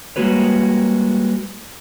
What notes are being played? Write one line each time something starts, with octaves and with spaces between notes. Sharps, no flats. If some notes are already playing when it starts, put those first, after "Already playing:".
G3 G#3 A#3 F#4 B4 C#5